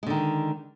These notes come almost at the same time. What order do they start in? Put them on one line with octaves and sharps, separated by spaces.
G#3 D3 D#3